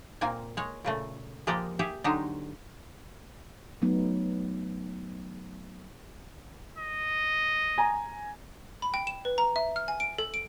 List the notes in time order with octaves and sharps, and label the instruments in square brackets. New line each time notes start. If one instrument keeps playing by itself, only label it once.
[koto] A#2 A#3 C4 G#5
G#3 C#5
A#2 C#3 A3
F3 G#3 A#3 G4 D5 D#5
G4 G#4 E5
D3 F#3 G#3 D#4 G4 C5
[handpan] F#3 A3 B3 D#4
[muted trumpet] D#5
[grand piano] G#5 A#5
[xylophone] B5
G5
E7
B4
A#5
E5
F6
G#5
D7
A4
D7